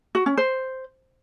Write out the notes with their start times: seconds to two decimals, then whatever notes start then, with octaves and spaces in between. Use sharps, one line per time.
0.15 F#4
0.26 C#4
0.37 C5